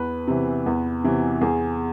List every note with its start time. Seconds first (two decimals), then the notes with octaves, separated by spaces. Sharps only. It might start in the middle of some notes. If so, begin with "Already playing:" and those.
Already playing: E2 B4
0.27 C3 E3
0.66 E2
1.04 C3 E3
1.41 E2 G#4